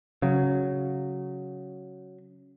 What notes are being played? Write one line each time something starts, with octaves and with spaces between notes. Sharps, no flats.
C#3 F#3